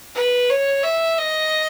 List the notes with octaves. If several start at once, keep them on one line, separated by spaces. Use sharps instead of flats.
B4
C#5
E5
D#5